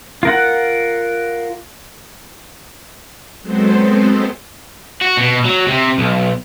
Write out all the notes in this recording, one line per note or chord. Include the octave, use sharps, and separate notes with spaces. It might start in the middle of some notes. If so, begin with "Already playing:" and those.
F4 A#4 F#5
F#3 G#3 B3 C4 A4 C5
F#4
B2
F#3
C3
B1